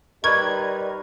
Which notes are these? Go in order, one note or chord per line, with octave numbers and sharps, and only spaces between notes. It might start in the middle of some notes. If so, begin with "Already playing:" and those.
G3 D#4 A#4 B4 D5 C#6 G#6